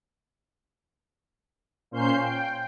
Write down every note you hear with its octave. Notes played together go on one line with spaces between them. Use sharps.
A#2 C#4 C5 F5 G6 C7
G5